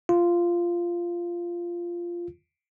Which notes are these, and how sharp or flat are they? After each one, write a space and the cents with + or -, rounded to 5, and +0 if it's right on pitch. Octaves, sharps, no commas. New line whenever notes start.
F4 -10